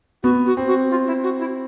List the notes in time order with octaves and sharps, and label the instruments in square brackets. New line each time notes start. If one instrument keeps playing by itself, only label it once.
[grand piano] B3 [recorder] F#4
[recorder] F#4
[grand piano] C4
[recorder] F#4
F4
E4
F#4
E4